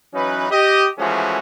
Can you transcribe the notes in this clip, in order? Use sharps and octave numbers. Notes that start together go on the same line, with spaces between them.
E3 F#3 C#4 D#4 B4
G4 D#5
E3 F3 G#3 A3 C#4 F#4